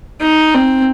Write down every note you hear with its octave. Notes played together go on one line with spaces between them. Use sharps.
D#4
C4